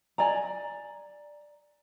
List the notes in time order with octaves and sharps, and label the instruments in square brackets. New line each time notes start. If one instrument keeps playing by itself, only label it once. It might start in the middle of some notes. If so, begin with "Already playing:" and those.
[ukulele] D5 G#5 A#5